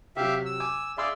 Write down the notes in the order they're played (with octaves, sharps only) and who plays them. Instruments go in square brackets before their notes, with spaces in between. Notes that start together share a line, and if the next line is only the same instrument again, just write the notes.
[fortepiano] C3 F#3 [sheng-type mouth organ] G4 E5 F5
[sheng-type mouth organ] E6
[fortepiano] G#5 D6
[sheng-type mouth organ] G#4 D5 F5 [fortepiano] E5 C6 E6